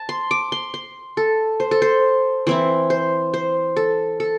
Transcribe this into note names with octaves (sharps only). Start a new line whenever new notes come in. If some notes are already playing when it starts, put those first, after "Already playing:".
Already playing: A5
C6
D6
C6
C6
A4
C5
A4
C5
E3 C4 E4 C5
C5
C5
A4
A4